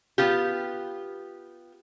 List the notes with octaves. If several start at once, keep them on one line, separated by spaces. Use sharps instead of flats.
B3 F4 G4